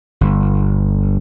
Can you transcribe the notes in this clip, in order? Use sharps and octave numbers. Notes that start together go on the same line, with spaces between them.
G1